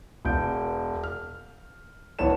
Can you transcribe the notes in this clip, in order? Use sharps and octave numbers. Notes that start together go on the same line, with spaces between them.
E1 B2 G6 D7
F6
D1 E3 B3 C#5 A5 E7